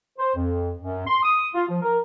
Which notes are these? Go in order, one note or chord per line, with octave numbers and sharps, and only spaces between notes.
C5
F2
F#2
C6
D#6
F4
F3
A#4